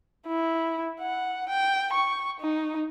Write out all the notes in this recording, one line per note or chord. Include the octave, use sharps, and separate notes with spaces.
E4
F#5
G5
C#6
D#4